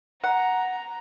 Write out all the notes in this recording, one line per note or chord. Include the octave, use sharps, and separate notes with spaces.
F#5 A#5